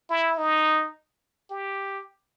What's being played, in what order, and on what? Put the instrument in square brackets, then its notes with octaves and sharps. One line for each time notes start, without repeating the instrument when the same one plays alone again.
[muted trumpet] E4
D#4
G4